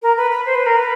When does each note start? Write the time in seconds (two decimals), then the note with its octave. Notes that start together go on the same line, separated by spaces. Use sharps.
0.02 A#4
0.17 B4
0.31 B4
0.46 C5
0.55 B4
0.66 A#4
0.77 B4